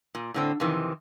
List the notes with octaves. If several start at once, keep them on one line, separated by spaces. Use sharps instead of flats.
A#2
A2 D3 C4
F2 C3 D#3 E3